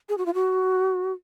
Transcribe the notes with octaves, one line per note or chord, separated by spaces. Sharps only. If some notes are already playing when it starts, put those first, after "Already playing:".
G#4
F#4
F4
F#4